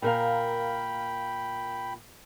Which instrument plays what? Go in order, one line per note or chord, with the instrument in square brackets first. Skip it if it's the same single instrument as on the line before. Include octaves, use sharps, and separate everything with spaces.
[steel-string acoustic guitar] A#2 A#4 F5 [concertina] G5 B5